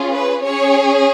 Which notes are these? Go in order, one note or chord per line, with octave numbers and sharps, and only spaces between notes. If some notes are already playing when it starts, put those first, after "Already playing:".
Already playing: C#4 F4 G#4
B4
C#4 G#4 C#5